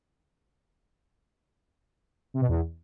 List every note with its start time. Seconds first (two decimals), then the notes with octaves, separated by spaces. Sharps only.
2.34 C3
2.41 B2
2.48 E2